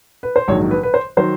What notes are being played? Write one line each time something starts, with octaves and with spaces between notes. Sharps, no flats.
B4
C5
A#1 G#2 D#3 F#3 C#5
B4
B4
C5
D#3 F#3 C5